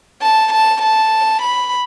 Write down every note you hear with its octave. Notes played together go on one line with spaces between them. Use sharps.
A5
A5
A5
B5